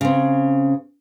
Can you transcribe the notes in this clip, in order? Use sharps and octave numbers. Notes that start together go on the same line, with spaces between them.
C#3 C4